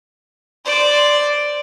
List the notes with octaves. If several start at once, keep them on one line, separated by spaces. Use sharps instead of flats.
C5 D5